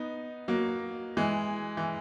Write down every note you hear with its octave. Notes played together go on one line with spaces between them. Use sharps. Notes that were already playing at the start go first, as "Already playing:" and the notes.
Already playing: B3 D#4
F#3 A#3
E3 G#3
E3